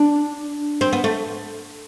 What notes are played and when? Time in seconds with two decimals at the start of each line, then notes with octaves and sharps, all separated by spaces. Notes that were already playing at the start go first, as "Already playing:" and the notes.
Already playing: D4
0.81 C4
0.93 B3
1.04 A3